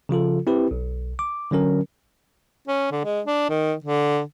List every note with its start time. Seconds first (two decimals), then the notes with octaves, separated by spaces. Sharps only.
0.09 C#3 F3 F4 A4
0.47 C4 E4 G4 B4
0.71 B1
1.19 D6
1.51 D3 F#3 C#4 A#4
2.68 C#4
2.91 D3
3.04 G#3
3.26 D4
3.49 D#3
3.84 D3